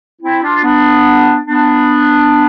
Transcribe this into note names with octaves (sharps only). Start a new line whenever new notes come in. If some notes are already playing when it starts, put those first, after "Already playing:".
C4 E4
D4 F4
B3 D4
B3 D4